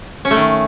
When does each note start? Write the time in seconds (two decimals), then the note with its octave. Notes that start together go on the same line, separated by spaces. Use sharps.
0.25 C#4
0.31 A3
0.37 D#3